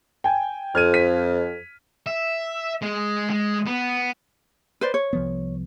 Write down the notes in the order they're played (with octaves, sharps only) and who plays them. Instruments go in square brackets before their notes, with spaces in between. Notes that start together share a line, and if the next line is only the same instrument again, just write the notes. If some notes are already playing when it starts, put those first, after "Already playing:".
[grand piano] G5 G#5
[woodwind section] F2 [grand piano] F6 G#6 D#7
[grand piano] B6 D#7
[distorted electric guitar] E5
G#3
G#3
B3
[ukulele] B4 C5 D5
C#5
[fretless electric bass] C2 F3 B3